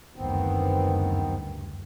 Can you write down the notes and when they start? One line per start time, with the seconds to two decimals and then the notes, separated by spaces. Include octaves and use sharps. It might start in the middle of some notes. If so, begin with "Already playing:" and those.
0.16 F#1 D2 G2 D#3 B3 C4